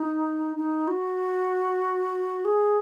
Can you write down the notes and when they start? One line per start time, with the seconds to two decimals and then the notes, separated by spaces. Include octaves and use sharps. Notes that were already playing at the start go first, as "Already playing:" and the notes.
Already playing: D#4
0.56 D#4
0.88 F#4
2.45 G#4